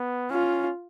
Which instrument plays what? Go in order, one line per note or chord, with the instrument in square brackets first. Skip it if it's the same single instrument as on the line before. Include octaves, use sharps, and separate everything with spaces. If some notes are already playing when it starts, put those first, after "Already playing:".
Already playing: [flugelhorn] B3
[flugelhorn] C#4 [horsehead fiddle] F4